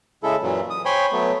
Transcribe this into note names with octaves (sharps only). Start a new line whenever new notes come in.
C#3 G#3 E4 A4
F#2 A#2 E3 F#3
D#6
C5 C#5 G5 G#5 B5 C6
F#3 A3 B3